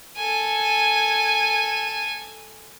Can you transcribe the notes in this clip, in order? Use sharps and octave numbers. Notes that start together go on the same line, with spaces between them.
A4 G#5